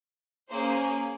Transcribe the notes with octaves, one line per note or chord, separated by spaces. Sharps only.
A#3 C#4 G#4 C5